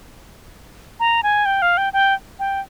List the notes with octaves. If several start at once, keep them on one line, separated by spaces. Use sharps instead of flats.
A#5
G#5
G5
F5
G5
G5
G5